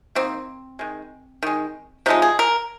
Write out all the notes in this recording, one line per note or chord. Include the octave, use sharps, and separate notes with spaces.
D#3 A#3 C4
D#3 G#3
D#3 G#3
C3 F3 G#3 D#4
G#4
A#4